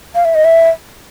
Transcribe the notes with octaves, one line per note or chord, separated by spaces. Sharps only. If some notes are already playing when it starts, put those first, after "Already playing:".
F5
E5
D#5
E5